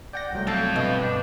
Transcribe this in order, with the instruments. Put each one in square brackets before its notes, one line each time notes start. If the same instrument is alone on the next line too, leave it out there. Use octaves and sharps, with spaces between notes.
[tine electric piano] D5 F#5 A#6 [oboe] G5
[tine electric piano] C2 F#3 A3 [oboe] G5
[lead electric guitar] C4 F5 [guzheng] A4
[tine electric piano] G2 [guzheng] B2
[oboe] D4